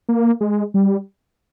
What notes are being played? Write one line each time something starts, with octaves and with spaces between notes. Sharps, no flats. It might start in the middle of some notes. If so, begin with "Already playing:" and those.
A#3
G#3
G3